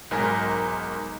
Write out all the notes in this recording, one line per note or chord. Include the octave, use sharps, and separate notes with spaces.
B1 G#2 A#4 G#5 A#5 A#6